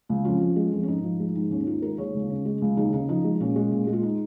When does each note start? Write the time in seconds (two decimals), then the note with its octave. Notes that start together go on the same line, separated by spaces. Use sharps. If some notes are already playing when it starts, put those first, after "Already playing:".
0.09 C#2
0.25 F2 C#4 F4
0.41 F3
0.56 G#3
0.72 F2
0.83 C#4
0.88 G#2 D#4
1.03 F3
1.20 G#3
1.36 G#2
1.51 D#2 C#4
1.66 D#3 C#4 F4
1.82 G#3 F4 A#4
1.98 D#2 G#4 C#5
2.14 C#2
2.30 C#3
2.45 G#3
2.62 C#2
2.77 D#2 D#4 G#4
2.93 C#3 D#4
3.09 F3 D#4
3.24 G#3
3.40 A#2 C#4
3.56 G#3
3.71 A#2
3.87 G#3
3.93 F4
4.03 D#4